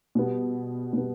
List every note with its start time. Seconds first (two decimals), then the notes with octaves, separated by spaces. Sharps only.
0.15 B2 G3 B3
0.93 B2 G3 B3